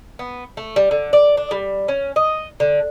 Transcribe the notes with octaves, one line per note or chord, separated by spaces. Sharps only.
B3
A3
G3
D3
D5
D4
G3
C#4
D#5
D3